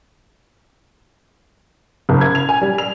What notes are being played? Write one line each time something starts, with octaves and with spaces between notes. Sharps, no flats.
F#1
G#6
F7
G#5
G3
F7